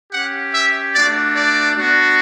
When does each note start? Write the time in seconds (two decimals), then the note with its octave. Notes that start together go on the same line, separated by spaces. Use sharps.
0.13 C#4 G4 F#5
0.53 E5
0.94 A3 D4 F#4 D5
1.35 D5
1.76 B3 D4 F#4